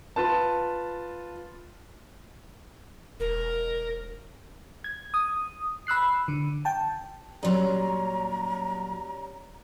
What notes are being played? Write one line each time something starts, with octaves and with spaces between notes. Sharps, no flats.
F4 B4 A5
E1 A#4
G#6
D#6
B5 E6 F#6 C7
D3
G5 A5
A#2 F#3 G3 C#4 A#5 C6